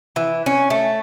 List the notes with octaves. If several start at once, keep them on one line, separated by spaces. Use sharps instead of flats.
E3
C#4
A3